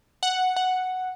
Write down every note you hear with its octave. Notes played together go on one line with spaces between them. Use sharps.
F#5
F#5